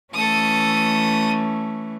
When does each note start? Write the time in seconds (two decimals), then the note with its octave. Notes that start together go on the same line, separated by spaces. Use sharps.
0.14 E3 A3 C#4 A4 D#6